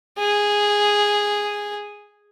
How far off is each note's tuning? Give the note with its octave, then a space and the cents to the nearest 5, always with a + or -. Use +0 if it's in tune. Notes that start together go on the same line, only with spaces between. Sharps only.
G#4 -10